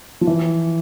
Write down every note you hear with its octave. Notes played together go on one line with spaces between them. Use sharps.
F3
E3